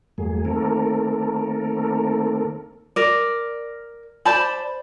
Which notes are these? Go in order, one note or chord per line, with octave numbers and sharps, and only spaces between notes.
E2 G2 F#3 A3 A#3 G#4
D#3 A3 A#3 C4 A4 A#4
A#4 D5
C5 D5 A5 B5